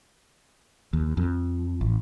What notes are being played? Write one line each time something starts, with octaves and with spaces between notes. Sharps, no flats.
D#2
F2
A1